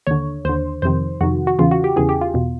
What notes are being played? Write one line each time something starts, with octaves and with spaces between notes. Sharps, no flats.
D#2 D3 C#5
D#2 D3 C5
F2 C3 D#3 C5
F2 C3 D#3 F#4
F#4
E2 C#3 E3 F4
F#4
G4
E2 C#3 E3 G#4
G4
F4
E2 B2